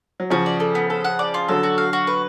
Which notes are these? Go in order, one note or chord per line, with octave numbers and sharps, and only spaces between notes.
F#3
C#3 F3 F#4
D5
A4
B3
A4
F#5
D5
F4
D3 F#3 A4
F#4
F5
F#4
B4